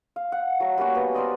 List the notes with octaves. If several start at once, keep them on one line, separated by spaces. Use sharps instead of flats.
F5
F#5
F#3 A3 A#5
G3 A#3 C#4 F#4
B3
A#4 C5 D5 D#5